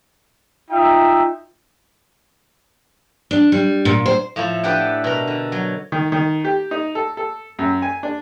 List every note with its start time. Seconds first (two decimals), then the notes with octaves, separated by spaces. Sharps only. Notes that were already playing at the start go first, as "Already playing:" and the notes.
0.70 D#4 F4 E5 G5
3.31 D4
3.52 G3
3.85 A#2
4.06 C5
4.36 A2 F3 E4 A4
4.63 D4 G4 A4 B4 F#5 G5
5.04 B2 A#4
5.27 D3
5.52 F#3
5.92 D#3
6.12 D#3
6.45 G4
6.71 D#4
6.95 A4
7.17 A4
7.59 F#2
7.82 G#5
8.03 D4